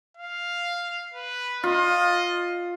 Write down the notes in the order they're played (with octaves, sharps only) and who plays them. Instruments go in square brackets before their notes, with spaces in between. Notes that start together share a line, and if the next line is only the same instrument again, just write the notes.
[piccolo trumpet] F5
B4
[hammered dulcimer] F4 [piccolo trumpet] D#5